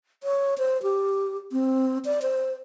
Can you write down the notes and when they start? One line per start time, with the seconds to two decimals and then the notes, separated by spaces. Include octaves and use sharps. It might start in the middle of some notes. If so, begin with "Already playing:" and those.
0.23 C#5
0.58 C5
0.83 G4
1.52 C4
2.05 D5
2.22 C5